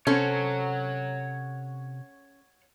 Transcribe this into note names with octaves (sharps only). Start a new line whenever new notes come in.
C3 C#4 A4 C5 C#5 F#5